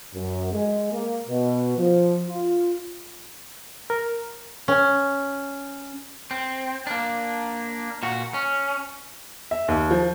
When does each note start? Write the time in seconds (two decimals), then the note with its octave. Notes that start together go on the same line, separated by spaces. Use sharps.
0.14 F#2
0.53 G#3
0.93 A#3
1.29 B2
1.78 F3
2.26 F4
3.90 A#4
4.68 C#4
6.31 C4
6.87 A#3 D4
8.03 A#2 F#4
8.34 C#4
9.51 E5
9.68 D#2
9.91 F3